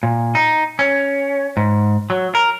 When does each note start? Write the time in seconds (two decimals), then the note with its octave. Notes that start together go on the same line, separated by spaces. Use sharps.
0.03 A#2
0.35 D#4
0.79 C#4
1.57 G#2
2.10 F#3
2.35 A#4